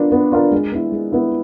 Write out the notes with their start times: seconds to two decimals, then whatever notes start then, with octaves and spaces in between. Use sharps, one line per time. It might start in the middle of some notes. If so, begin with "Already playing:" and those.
Already playing: B3 D4 F4 A#4 D5
0.12 B3
0.32 D4 F4 A#4 D5
0.51 G#3
0.72 B3 E4
0.92 G#3
1.12 B3 E4